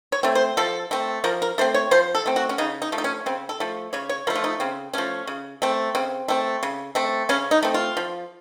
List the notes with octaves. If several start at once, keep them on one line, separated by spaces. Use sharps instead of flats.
C#5
A3 C4
C5
F3 A4
A3 C4
F3 A#4
A#4
A3 C4 C5
C#5
F3 C5
A4
A3 C4
F#4
C#4
C#3 D#4
D#4
F3 A3
D#4
C#4
C#3 C4
A4
F3 A3
C#3 C#5
C#5
F3 A3 A#4
F4
D#4
C#3 C4
F3 A3 C#4
C#3
A3 C4
C#3 C4
A3 C4
C#3
A3 C4
C#3 C#4
D#4
A3 C4
F4
F3